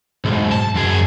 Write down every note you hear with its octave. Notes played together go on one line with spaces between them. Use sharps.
B1 G#2
A5
F#2 G#4